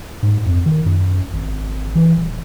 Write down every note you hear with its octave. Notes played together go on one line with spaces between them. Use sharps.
G#2
F2
D#3
F#2
G#1
E3
D#1